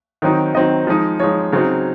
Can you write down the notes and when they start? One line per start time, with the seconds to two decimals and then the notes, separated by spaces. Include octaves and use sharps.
0.22 D#3 F#3 C4 D#4
0.54 D#3 F#3 C4 D#4 D#5
0.87 F3 G#3 D#4
1.20 F3 G#3 D#4 C#5
1.52 C#3 F#3 C4 D#4